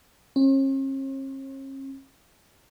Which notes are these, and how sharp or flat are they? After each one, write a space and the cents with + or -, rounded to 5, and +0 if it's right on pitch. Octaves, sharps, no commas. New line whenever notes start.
C#4 -45